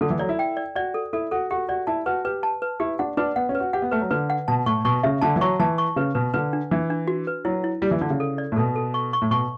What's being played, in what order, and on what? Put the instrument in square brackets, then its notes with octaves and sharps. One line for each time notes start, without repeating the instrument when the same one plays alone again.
[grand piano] D3 [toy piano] A4
[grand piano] E3
[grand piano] F#3 [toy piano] D5
[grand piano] E4
[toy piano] G5
D5
[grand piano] F#4 [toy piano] D5
[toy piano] A4
[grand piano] E4 [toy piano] A4
[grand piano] F#4 [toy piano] A4
[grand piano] F#4 [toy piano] G4
[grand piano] F#4 [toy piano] D5
[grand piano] E4 [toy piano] A5
[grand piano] F#4 [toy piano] B4
[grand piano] G4 [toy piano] B4
[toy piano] A5
B4
[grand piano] E4 [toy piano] G4
[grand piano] D4 [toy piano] F#5
[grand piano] D4 [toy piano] B4
[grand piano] B3 [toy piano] F#5
[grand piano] C#4
[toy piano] B4
[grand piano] F#4
[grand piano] G4 [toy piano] F#5
[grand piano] B3
[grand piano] A3 [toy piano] B4
[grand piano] F#3
[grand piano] D3 [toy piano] B4
[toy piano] F#5
[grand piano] B2 [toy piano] A5
[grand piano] A2 [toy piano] C#6
[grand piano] B2 [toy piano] C#6
[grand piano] C#3 [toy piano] E5
[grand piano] D3 [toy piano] A5
[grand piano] E3
[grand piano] F#3 [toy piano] C#6
[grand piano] E3 [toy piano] A5
[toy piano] C#6
[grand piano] C#3 [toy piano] B4
[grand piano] B2 [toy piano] B4
[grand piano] D3 [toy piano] B4
[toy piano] D4
[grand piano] E3 [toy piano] D4
[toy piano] D4
F#4
B4
[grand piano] F#3 [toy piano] E4
[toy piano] E4
[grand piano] G3 [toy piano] E4
[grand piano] E3
[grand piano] D3 [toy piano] D5
[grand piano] C#3
[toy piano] A4
D5
[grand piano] A2
[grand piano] B2 [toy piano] A4
[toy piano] A4
C#6
C#6
[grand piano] A2
[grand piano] B2 [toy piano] C#6